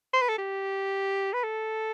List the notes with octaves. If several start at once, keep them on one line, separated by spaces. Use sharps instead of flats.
C5
B4
A4
G4
B4
A4